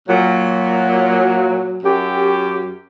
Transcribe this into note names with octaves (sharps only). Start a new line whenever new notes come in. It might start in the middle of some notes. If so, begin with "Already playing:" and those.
A#2 F#3
F#2 G4